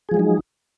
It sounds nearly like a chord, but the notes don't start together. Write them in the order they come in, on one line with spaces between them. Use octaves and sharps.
G#4 F3 G#3 F#3 D#4